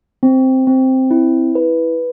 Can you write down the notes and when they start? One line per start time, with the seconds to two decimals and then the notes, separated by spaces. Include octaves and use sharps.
0.23 C4
0.67 C4
1.11 E4
1.55 B4